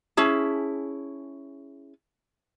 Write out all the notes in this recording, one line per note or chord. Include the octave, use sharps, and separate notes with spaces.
C#4 E4 G#4 A5